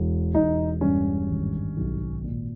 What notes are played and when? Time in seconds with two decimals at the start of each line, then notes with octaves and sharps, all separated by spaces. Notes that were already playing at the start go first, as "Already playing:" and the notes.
Already playing: E1
0.35 E1 D#4
0.81 G2 C#4
1.29 G#1
1.77 B1
2.24 A#2